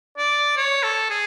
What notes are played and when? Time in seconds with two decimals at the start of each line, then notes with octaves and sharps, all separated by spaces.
0.18 D5
0.57 C#5
0.83 A4
1.10 G#4